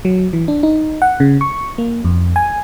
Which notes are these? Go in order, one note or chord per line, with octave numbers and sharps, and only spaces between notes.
F#3
E3
D4
D#4
F#5
C#3
C#6
A#3
F2
G#5